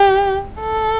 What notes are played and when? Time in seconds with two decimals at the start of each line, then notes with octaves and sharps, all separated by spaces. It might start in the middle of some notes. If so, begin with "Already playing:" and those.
Already playing: G4
0.61 A4